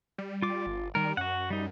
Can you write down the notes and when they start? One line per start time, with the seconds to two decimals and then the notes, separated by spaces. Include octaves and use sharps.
0.18 G3
0.42 F4 D6
0.66 G1
0.95 D#3 G3 A#4
1.17 F#2 F#4 F#5
1.50 G3 D#4